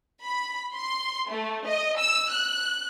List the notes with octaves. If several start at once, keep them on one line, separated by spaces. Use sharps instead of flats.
B5
C6
A3
D#5
E6
F#6